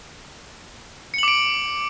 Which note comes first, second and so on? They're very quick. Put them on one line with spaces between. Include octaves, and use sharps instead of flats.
C#7 F#7 D6 D7